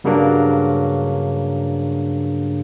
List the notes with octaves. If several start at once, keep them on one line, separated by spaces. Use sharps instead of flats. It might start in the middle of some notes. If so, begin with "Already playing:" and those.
G2 C#3 F#3 A#3 D4